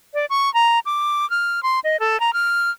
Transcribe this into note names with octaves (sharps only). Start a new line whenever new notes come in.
D5
C#6
A#5
D6
F6
C6
D#5
A4
A#5
F6